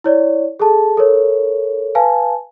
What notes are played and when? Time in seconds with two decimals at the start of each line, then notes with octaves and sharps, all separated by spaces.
0.04 E4 C#5 D5
0.60 G#4 A4 A5
0.97 A4 A#4 C#5
1.95 B4 F5 G#5 A5